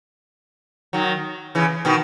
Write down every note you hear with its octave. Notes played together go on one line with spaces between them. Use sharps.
D#3 F#3
C#3 E3
B2 D#3